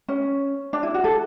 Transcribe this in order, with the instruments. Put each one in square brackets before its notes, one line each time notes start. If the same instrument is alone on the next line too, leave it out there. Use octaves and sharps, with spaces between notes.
[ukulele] C#4
D4
E4
F#4
A4